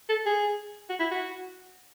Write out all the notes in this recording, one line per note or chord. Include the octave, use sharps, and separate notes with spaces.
A4
G#4
F#4
E4
F#4